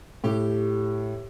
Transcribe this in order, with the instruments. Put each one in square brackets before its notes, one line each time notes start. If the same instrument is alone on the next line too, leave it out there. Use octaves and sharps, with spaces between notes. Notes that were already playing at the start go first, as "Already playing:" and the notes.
[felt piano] A2 [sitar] G4